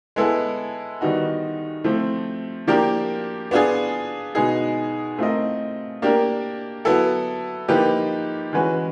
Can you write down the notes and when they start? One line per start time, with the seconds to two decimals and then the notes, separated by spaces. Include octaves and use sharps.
0.16 G#3 B3 E4 A4
1.01 D#3 G3 B3 D#4 F#4
1.84 F3 A3 C4
2.67 F3 A#3 D4 G4 A#4
3.51 B3 D4 F4 G#4
4.35 B2 G#3 B3 D#4 G#4
5.18 A3 C4 F4 A#4 D#5
6.02 A#3 D4 G4 A#4
6.85 F#3 B3 E4 A4
7.68 F3 A#3 D#4 G4 B4
8.53 E3 G#3 C#4 F#4 B4